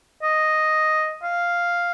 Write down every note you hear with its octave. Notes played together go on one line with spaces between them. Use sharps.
D#5
F5